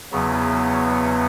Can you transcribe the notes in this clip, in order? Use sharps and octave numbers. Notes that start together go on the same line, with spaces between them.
E2 C#3 F#3 B3